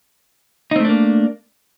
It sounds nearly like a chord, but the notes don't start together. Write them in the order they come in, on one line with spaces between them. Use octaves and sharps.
D#4 C4 A3 D4 A#3